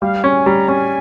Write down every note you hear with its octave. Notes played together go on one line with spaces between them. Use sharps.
G3 F5
C#4 G#5
G3 A#5
C#4 G#5